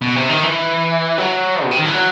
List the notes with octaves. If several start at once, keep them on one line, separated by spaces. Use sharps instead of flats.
B2
C3
D#3
E3
F#3
B2
C3
D#3
E3
F#3